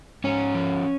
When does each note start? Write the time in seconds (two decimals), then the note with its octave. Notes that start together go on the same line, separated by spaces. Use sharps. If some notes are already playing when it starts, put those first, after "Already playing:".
0.24 G#2 C#4 C#5
0.55 F3